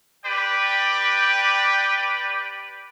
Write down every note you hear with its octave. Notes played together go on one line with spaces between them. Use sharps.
G4 B4 D5 G5